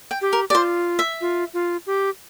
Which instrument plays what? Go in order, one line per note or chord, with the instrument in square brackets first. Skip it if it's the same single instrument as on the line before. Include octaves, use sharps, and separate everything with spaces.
[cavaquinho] G5
[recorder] G4
[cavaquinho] A#4
[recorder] G4 [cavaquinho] D5
[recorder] F4 [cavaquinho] C5
[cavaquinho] E5
[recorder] F4
F4
G4